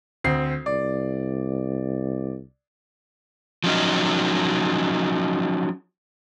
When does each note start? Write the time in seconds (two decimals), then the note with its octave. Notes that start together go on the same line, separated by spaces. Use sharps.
0.24 D2 C4 C7
0.66 C2 D5
3.64 F3 F#3 C#4 D#4